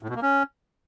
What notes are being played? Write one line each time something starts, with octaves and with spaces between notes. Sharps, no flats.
A2
B2
A#3
C#4